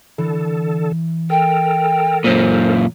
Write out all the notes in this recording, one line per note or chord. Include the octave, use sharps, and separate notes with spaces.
D3 E3 A4
A4 A#4 G5
F#2 A#2 C5